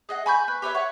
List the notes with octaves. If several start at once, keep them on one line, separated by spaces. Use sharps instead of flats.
G#4 D#5 F#5
G#5 B5 C#6 G6
B4
G4 B4 C#5 E5
C#5 F#5 C#6